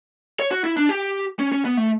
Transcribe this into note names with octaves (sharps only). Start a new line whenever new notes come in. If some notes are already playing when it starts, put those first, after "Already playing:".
C#5
F#4
E4
D4
G4
C#4
C#4
B3
A3